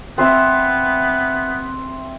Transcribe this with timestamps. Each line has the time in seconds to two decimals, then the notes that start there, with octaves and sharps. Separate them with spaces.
0.18 B3 C4 C5 E5